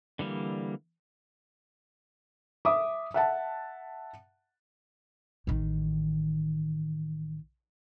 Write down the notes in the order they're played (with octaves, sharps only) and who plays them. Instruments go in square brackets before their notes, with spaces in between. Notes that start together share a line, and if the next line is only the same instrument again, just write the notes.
[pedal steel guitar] D3 E3 G3 A#3
[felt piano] E5 D6 D#6
E5 F#5 A5
[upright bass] A1 D#3